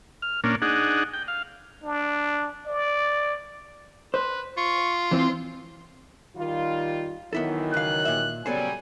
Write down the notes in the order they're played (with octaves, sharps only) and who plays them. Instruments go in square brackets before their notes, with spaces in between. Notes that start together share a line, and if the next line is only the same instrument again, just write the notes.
[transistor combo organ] F6
A#2 A#3 C#4 D4
D4 D#4 G#4 F#5
G5
F5
[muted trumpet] D4
D5
[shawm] B4 [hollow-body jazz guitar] C5
[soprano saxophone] F4 [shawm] C#6
[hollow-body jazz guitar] E3 C4 [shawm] C6
[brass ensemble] D#3 G3 F4
[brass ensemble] D#3 E3 F#3 [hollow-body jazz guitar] B3 E4 A4
[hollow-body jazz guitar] C#2 F5 [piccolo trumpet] F#6
[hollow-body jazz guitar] A#2 E5
[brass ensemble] C#3 F#3 G3 [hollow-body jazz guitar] B3 A4 C5 [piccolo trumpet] G#5